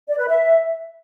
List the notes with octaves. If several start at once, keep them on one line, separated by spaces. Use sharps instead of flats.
D5
B4
E5